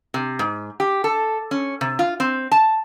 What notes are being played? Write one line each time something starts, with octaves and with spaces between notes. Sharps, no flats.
C3
G#2
G4
A4
C#4
C3
F4
C4
A5